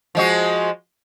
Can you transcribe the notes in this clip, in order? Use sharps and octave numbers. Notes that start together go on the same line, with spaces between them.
F3 G#3 F#4